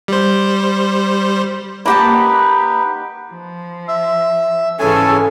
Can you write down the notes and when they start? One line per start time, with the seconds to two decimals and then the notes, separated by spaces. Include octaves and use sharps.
0.08 G3 C5
1.86 A#3 D#4 G4 B4 F#5 A5 B5
3.31 F3
3.88 E5 E6
4.79 G#2 C#3 E3 C#4 A4 G#5